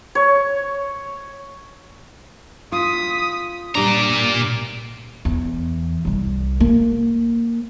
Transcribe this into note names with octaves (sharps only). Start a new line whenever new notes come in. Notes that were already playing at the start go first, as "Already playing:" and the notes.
C#5
F4 D#6 B6
A#2 G3 D4 A#5 D6
E2
C2 G3
A#3